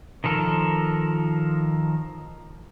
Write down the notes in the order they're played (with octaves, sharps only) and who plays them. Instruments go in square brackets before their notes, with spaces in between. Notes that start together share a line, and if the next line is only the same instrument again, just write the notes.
[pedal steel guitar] D#3 F3 A4 A#4